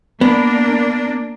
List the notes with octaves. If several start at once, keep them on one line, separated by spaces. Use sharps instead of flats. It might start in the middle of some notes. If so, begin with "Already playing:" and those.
A#3 B3 D4